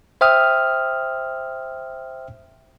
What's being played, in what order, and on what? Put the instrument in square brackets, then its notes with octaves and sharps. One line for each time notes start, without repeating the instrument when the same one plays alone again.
[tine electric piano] C5 E5 G5 D#6 F6